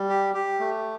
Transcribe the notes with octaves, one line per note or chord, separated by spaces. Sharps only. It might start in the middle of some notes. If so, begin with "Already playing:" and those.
Already playing: G3
G4
G4
A3